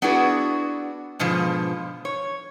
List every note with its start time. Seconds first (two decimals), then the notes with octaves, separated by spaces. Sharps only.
0.02 B3 D4 E4 F#4 G#4 B4
1.19 G#2 B2 D3 F3
2.05 C#5